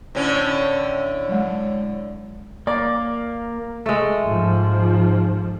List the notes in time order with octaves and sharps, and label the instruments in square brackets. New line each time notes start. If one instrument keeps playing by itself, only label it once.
[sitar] A2 D3 C#4 [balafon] C5
[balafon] F#3 G#3
[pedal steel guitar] A#3 [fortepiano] D5
[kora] G#3 A3
[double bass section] G#2 F3